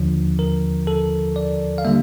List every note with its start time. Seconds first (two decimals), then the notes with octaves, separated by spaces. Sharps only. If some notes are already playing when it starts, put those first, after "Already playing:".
Already playing: D#2 D3 F3
0.39 A#4
0.87 A4
1.36 D5
1.78 F5
1.85 D3 G3 A#3 E5